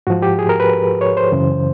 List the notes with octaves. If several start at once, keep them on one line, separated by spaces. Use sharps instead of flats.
G#2 F3 F#4
G4
G#4
A#4
B4
C#5
C5
F#2 C#3 E3